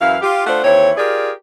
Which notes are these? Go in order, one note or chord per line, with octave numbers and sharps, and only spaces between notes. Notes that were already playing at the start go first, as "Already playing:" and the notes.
F#2 E3 E4 F5
F4 G4
A3 D4 F4 C5 F#5
D#2 E3 C4 C#5
F4 G4 G#4 A#4 D5